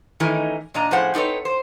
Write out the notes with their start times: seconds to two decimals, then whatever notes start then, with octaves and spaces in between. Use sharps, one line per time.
0.20 D#3 E3 A3 C#4 D#4 A#4
0.74 A#2 D4 D#5 A#5
0.91 A2 F3 C#4 G#4 C5 F#5
1.14 C4 D#4 A4 B4 C#5
1.45 C5